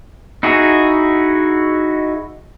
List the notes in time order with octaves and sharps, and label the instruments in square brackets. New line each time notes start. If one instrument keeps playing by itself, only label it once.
[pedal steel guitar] D#4 E4 F#4 G#4